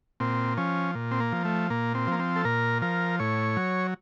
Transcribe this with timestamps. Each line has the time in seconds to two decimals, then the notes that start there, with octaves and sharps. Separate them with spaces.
0.20 A#2 C4
0.57 F3 C#4
0.95 A#2
1.11 C4
1.20 A#3
1.32 F3
1.45 A3
1.70 A#2 A#3
1.95 C4
2.07 F3 A#3
2.19 C4
2.36 A4
2.45 A#2 A#4
2.82 F3 A#4
3.20 A2 C#5
3.57 F#3